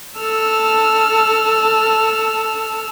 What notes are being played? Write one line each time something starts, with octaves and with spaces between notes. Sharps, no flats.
A4 A5 E6 F6